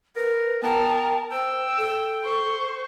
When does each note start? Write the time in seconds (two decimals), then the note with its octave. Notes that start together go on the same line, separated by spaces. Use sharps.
0.16 A#4 B4
0.63 B3 A#4 G5 A5
1.32 C5 G5 E6
1.77 A4
2.23 C5 C#6